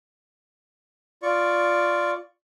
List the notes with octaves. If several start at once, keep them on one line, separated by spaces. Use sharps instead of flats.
F4 D5 C#6